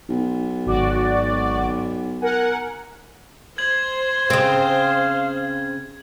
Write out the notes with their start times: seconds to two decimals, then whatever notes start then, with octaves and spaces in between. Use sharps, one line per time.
0.09 B1
0.66 G#1 F#4 D5
2.21 A#4 F#5 G#5
3.58 C5 G#6 F#7
4.30 C#3 C4 F5